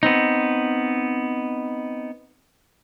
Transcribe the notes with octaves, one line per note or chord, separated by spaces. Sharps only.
B3 C4 D#4